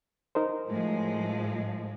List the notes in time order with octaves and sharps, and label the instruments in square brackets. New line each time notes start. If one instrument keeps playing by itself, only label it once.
[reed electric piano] D#4 A#4 C5
[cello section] A2 F3 G#3